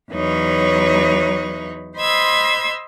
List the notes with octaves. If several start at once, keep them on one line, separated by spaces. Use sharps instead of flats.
E2 F#3 D#4 B4 C#5
C5 D#5 B5 C6 E6 G#6